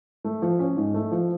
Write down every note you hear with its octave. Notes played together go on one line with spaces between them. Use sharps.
A3
F3
C#4
G#2
A3
F3